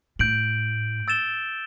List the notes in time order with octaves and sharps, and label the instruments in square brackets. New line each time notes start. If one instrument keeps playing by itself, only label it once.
[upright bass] A2 [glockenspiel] G6 D7 F#7
[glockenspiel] E6 A6 E7 G7